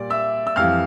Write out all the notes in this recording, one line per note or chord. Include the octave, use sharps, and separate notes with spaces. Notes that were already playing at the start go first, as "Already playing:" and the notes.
Already playing: A#2 G3 D5
E5 E6
E6
F2 E3 G3 F5 F6